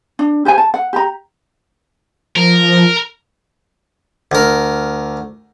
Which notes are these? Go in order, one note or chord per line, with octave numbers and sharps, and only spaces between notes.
D4
G4 B4 C5 G#5
A5
F#5
G4 A#5
F3 A#4
D2 A#4